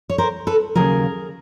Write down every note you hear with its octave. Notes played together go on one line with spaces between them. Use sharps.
C#5
A#4 C5
A4 B4
D#2 C#3 F#3 A#3 G#4 A#4